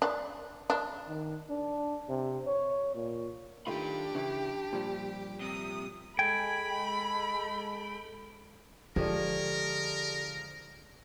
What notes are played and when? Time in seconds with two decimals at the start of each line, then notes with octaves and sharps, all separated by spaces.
0.02 D4
0.70 D4
1.08 D#3
1.50 D4
2.09 C3
2.47 C#5
2.95 A#2
3.67 D#3 A3 D4 F4 G4 B5
4.15 C#3 E3 E4
4.73 A#2 F3 G3
5.41 C3 D#6
6.19 G#3 A4 G5 G#5 B5
8.96 D3 F3 G#3 G4 A4 A#4 D5